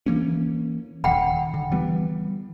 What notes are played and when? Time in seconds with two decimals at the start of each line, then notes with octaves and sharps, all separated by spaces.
0.06 E3 A#3 C#4
1.04 D#1 D#3 F#5 G5 B5
1.54 D3
1.71 E3 G3 B3